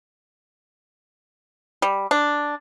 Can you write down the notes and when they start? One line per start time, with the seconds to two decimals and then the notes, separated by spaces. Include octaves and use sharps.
1.82 G3
2.11 D4